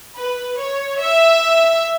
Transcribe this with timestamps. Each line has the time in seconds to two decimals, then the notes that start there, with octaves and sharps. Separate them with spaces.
0.15 B4
0.57 C#5
0.98 E5